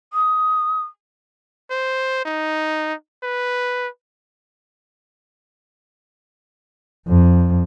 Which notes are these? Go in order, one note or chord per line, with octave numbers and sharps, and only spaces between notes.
D#6
C5
D#4
B4
F2